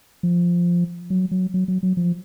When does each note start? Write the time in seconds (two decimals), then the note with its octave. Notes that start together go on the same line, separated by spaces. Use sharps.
0.23 F3
1.10 F#3
1.31 F#3
1.54 F#3
1.68 F#3
1.83 F#3
1.97 F3